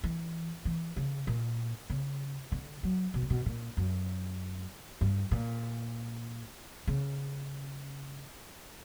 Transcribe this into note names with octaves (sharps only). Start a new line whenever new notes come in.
E3
E3
C#3
A#2
C#3
D3
F#3
B2
C#3
B2
A#2
F#2
G2
A#2
C#3